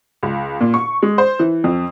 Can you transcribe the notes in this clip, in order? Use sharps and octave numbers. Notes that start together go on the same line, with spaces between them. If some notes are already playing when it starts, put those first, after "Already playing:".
C#2
A#2
C#6
G#3
C5
E3
F2